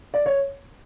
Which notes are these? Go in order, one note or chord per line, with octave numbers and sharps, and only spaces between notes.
D5
C#5